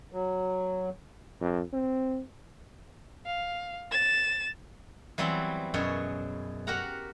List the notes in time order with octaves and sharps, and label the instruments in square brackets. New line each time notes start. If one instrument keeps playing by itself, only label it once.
[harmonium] F#3
[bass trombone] F2
C4
[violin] F5
A6 E7
[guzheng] E3 F#3 G3 B3 C4 E4
F#2 B2 G#4 C#5
F#4 G4 A#4 F#5 A#5